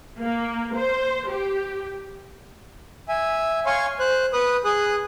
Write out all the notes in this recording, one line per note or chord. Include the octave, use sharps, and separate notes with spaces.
A#3
C5
G4
E5 G#5
C#5 F5 G#5 C6 C#6
C5 F#6
B4 D#6 F#6
G#4 D#6 F#6